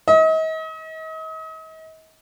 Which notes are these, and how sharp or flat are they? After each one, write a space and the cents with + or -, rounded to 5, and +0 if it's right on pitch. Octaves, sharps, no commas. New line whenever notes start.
D#5 +40